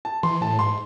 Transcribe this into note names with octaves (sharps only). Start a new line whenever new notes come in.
A5
E3 C6
A2 A5
G#2 C6